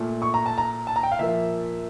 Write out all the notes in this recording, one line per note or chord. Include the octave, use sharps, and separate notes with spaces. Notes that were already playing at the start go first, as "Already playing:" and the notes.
Already playing: A#2 A3
C#6
A#5
A5
A#5
A5
A#5
G5
F5
A#2 F3 A#3 E5